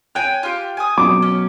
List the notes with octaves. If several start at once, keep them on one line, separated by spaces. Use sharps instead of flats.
C#5 G5 G#5 F#6 G6
F4 G4
G#5 D#6
B2 F#3 D6
C#4